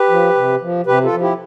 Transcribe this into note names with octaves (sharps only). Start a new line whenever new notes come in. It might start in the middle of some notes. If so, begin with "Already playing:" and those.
Already playing: G4 B4
F3
C3
F3
C3 G4 B4
F4 A4
F3
E4 G4